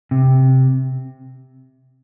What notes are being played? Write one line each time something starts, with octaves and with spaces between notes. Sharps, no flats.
C3